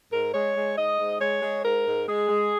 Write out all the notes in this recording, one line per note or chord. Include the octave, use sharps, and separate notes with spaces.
G#2 A#4
G#3 C#5
G#3
G#2 D#5
G#2
G#3 C#5
G#3
G#2 A#4
G#2
G#3 G#4
G#3